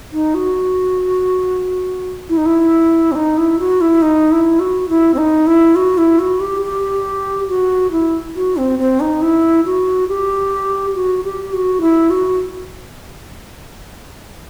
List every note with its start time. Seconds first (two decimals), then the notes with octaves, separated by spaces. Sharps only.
0.13 D#4
0.35 F#4
2.29 E4
2.37 D#4
2.46 E4
3.12 C4
3.15 D#4
3.37 E4
3.60 F#4
3.81 E4
4.02 D#4
4.31 E4
4.60 F#4
4.89 E4
5.14 C4
5.18 D#4
5.47 E4
5.76 F#4
5.98 E4
6.19 F#4
6.40 G4
6.62 G4
7.48 F#4
7.92 E4
8.36 F#4
8.57 C4
8.79 C4
9.00 D#4
9.22 E4
9.65 F#4
10.09 G4
10.95 F#4
11.24 G4
11.53 F#4
11.81 E4
12.10 F#4